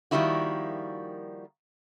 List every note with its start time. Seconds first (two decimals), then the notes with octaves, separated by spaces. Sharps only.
0.11 D#3 F3 G3 A#3 E4 F#4